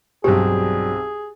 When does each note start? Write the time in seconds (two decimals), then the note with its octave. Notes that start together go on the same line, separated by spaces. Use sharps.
0.24 B1 G2 F#3 C4 D4 G4 G#4